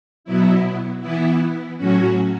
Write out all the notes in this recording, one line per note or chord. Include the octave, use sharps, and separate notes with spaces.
B2 F#3 B3 E4
E3 B3 E4
A2 F#3 C#4 F#4